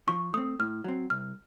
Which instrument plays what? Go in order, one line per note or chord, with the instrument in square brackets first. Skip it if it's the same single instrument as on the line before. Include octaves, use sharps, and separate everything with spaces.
[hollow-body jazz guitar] F3 [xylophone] C#6
[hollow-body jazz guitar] A3 C4 [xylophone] D#6
[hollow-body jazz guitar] A2 [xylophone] F6
[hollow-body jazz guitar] F#3 C4
[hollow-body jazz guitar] C2 [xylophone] F6